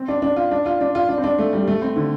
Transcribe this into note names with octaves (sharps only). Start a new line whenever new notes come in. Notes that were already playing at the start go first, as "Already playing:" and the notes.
Already playing: C4
D4
D4
F4
D4
F4
D4
F4
D4
C4
D4
A3
G3
A3
C4
D3